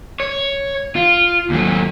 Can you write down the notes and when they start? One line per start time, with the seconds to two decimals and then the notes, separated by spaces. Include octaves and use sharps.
0.20 C#5
0.96 F4
1.50 D#2 F#3